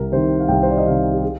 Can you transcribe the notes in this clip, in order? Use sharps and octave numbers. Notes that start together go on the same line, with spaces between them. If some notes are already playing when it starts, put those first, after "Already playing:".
Already playing: C2 A#4
C3 D#3 C5
F5
C2 G5
C5
D5
D#5
C3 D#3 F5
G4
G#4